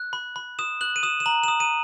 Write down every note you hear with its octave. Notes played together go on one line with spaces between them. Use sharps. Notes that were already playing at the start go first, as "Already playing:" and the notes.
Already playing: F#6
B5
B5
D#6 E7
F#6 F#7
D#7
D#6 E7
E7
A#5 F#7
E7
D#6
D#7